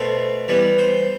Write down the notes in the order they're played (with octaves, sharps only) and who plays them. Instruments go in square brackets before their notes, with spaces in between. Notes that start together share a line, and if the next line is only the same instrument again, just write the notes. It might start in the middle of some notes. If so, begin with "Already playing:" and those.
Already playing: [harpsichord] B2 A3 C4
E3 G3 B3
C5